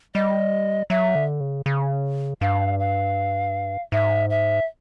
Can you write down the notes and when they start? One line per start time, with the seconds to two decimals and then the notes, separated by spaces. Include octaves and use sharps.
0.14 G3 D#5
0.90 F#3 E5
1.15 D3
1.40 C#3
1.66 C#3
2.41 G2 F5
2.79 F5
3.92 G#2 E5
4.30 E5